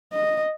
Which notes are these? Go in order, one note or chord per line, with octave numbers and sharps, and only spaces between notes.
D#5